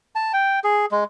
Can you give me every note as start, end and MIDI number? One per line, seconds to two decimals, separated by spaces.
0.15 0.32 81
0.33 0.60 79
0.64 0.86 68
0.91 1.04 56